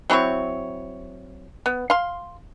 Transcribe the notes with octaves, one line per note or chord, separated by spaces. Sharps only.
F#3 C4 E4 C#5
B3
F5 C6